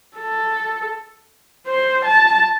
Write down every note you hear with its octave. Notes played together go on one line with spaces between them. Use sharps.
A4
C5
A5